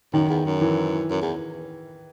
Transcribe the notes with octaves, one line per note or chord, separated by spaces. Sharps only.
F#2 D#3
E2
F#2
E3
F#2
E2